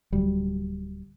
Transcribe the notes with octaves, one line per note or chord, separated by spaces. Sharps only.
D1 D2 F#3 G3